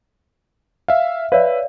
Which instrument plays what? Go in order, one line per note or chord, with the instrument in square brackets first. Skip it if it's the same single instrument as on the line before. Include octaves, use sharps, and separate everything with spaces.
[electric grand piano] E5 F5
[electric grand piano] B4 E5 [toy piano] C#5 D5 F5